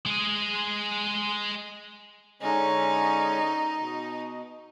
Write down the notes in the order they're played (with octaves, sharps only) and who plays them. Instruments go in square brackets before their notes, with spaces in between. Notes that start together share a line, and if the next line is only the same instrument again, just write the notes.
[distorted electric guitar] G#3 G#4
[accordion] D3 G#3 C#4 [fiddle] D#4
[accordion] B2